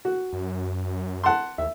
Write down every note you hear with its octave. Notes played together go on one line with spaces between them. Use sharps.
F#4
F#2
F#5 A5 C6
D#2 E5